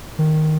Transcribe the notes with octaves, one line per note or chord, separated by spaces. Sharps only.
D#3